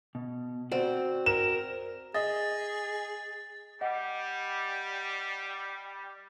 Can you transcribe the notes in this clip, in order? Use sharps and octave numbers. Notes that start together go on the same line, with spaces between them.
B2
C4 F#4 D5 F#5
A#4 E7
G#4 D#5 A6
G3 D#5 F#5